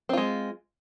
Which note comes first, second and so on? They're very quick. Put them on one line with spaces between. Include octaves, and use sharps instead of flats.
C4 F4 G#3